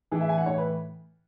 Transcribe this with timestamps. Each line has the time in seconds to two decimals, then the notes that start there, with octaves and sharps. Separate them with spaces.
0.11 A2 E3 G#4
0.21 E5
0.29 G#5
0.38 F#5
0.46 A2 E3 C#5
0.58 B4